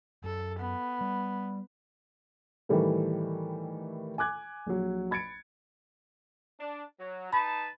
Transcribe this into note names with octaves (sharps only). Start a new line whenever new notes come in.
F#2 A4
B3
G3
A2 D#3 E3 G3 A3
G#5 D6 F#6 G#6
A#1 F#3
B5 G#6 A6 C#7 D7
D4
F#3
D#4 B4 A5 B5